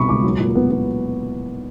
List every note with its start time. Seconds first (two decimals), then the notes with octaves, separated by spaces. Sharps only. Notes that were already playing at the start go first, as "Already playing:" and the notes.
Already playing: C2 B2 C4 B5 C#6 D#6
0.09 C#2 D6
0.23 F#3
0.40 A#2
0.55 B3
0.71 B3